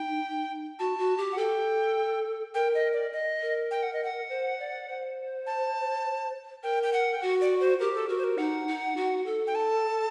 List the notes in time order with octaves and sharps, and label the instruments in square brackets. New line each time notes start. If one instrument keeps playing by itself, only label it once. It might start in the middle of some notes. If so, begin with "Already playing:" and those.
Already playing: [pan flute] D#4 [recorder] G5
[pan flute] F#4 [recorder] A5
[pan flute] F#4
G4
[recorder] F#5
[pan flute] A4 [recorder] G5
[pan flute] A#4 [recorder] G5
[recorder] D#5
D5
D#5
[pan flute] A#4
[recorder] G5
F#5
D#5
F#5
[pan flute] C5
D5
C5
[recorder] A5
[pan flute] A#4 [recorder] G5
[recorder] G5
F#5
G5
[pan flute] F#4 [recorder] F#5
[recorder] D5
C5
[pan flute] G4 [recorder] A#4
[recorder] A4
[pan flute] F#4 [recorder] A#4
[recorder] C5
A#4
[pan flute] D#4 [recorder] F#5
[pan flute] D#4
F#4
A4
[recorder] G5
A5